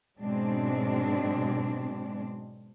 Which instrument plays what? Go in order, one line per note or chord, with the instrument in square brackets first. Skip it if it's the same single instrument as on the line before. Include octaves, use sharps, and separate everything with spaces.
[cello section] G#2 B2 F#3 G#3 C4 D4